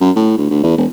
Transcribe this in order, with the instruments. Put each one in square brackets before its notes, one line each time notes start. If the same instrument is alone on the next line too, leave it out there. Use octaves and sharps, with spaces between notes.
[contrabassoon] F#2
A2
D2
D2
E2
E1